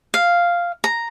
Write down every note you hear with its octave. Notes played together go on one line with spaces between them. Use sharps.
F5
A#5